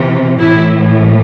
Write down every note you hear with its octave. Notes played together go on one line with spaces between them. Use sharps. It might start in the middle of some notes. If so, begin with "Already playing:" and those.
Already playing: C3 E3
A2 E3 E4